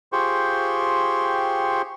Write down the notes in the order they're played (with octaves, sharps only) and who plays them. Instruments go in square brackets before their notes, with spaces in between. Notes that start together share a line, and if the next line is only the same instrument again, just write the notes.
[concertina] F4 G4 G#4 C5 G5 C#6